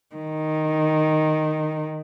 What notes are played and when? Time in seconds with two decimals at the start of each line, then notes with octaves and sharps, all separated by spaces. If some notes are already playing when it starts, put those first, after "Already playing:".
0.15 D#3